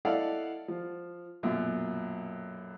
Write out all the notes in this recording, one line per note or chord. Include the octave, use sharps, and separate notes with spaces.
E4 A4 D5 D#5 F5 F#5
F3
B1 F#2 A#2